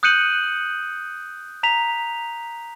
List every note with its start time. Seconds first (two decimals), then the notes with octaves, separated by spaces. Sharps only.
0.03 D#6 F#6 G6 C#7 D#7 F#7
1.63 A#5 B6 F7